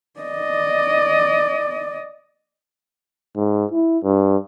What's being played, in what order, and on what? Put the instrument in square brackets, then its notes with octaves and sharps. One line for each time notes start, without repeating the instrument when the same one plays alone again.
[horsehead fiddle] D5 D#5
[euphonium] G#2
E4
G2